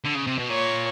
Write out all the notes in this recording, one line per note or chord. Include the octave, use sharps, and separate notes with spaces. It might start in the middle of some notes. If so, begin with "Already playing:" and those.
D3
C#3
C3
B2
A#2 C#5